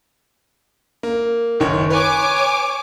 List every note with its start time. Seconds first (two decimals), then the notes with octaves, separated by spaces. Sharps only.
1.03 A#3
1.60 F#1 D#3 C#5
1.90 B4 C#5 G#5 D6